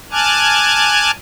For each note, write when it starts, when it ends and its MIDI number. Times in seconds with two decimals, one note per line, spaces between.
0.12 1.11 80
0.12 1.11 81
0.12 1.11 86
0.12 1.11 89
0.12 1.11 90
0.12 1.11 92